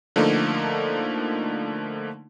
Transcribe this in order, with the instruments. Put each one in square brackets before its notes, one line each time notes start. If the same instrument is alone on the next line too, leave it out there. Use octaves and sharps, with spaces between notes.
[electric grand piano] D3 F3 A3 A#3 D#4